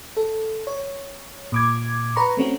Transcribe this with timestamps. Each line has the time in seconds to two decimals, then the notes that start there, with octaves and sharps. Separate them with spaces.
0.17 A4
0.67 C#5
1.52 A#2 D6 G#6
2.16 B4 A#5 B5 C#6
2.37 A3 C4 C#4 F#4